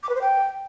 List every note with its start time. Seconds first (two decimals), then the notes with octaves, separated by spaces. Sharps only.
0.03 D6
0.09 B4
0.15 C5
0.21 G5